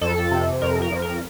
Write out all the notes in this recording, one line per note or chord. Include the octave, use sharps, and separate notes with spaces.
F2 A4
C3
F2 A#4
A#4
F2
A#4